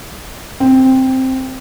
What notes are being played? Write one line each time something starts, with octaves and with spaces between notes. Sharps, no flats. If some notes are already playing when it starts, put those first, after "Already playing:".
C4